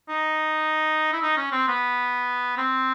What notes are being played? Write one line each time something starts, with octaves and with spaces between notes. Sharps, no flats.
D#4
E4
D#4
C#4
C4
B3
C4